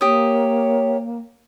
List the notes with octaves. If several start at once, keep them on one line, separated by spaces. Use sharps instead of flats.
A#3 G4 C#5 D#6